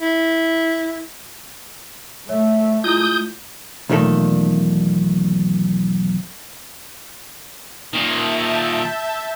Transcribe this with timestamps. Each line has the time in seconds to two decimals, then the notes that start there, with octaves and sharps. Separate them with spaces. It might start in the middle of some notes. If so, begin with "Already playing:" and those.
0.01 E4
2.29 A3 C#5 E5
2.84 G#3 E4 F4 D#6 G6
3.89 B1 E2 A#2 D#3 A3 A4
7.93 A#2 D#3 E5 A5 G6